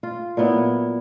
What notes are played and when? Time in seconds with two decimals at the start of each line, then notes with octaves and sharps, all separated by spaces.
0.03 F4
0.37 A#2 F#3 B3 E4